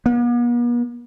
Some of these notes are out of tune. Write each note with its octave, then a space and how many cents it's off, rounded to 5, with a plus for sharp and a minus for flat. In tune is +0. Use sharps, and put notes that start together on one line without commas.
B3 -45